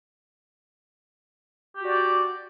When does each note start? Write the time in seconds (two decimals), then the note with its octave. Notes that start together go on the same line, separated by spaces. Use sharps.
1.76 G4
1.80 F#4
1.85 D4
1.90 D5